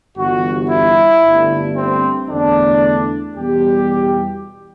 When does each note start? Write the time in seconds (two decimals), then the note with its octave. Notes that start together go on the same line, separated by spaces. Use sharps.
0.17 G1 G2 E3 F#4
0.71 E4
1.23 G1 G2 D3 A3
1.77 C4
2.30 E2 D3 A3 D4
3.36 E2 B2 G3 G4